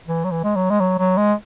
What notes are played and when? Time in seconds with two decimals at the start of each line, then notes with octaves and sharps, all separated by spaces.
0.07 E3
0.24 F#3
0.31 E3
0.44 G#3
0.56 F#3
0.70 G#3
0.80 F#3
0.99 F#3
1.17 G#3